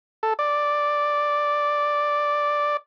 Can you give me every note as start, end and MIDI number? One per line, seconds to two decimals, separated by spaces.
0.23 0.33 69
0.39 2.77 74